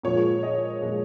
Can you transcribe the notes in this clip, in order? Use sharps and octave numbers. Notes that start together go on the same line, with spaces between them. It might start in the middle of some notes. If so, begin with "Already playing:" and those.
A#2 F3 G#3 C#5
D#5
A#2 F3 G#3